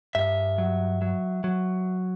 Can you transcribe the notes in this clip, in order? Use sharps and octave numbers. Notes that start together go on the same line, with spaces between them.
G2 E5
F#3
F#3
F#3